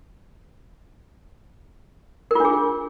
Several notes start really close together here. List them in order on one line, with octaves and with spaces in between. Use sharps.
A#4 F4 D4 G#4